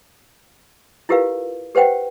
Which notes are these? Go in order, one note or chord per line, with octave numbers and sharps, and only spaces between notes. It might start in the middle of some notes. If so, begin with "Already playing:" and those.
E4 F4 G4 A#4 B4 F5
G4 B4 C5 F#5 G5